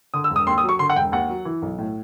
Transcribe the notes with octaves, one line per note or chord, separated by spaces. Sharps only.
D3 D#6
E6
E1
D#6
D#2 C6
D#6
F#3
C#6
D3 C6
F#5
E1 G5
D#2 F#5
F#3
E3
B1
A2